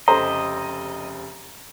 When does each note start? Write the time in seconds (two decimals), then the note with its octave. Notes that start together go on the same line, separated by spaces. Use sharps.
0.08 F1 C#3 G4 A4 C5 D#5 A#5